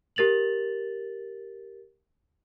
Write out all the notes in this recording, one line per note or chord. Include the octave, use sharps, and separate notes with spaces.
G4 A#4 A6 F7 F#7